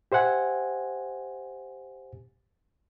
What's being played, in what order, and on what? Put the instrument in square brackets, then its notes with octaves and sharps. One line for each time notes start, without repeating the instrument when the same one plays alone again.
[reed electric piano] G4 C5 E5 F#5 G#5